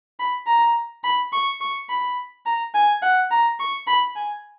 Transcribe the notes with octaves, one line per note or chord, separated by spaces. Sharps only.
B5
A#5
B5
C#6
C#6
B5
A#5
G#5
F#5
A#5
C#6
B5
G#5